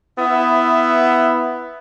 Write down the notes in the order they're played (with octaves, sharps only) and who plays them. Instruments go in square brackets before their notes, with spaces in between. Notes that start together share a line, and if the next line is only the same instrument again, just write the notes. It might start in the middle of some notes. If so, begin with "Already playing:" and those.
[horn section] B3 E4 E5